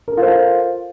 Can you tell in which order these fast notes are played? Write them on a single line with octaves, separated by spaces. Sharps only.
A#4 A4 F4 C5